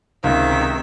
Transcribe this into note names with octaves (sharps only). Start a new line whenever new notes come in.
C#2 C3 D#3 E5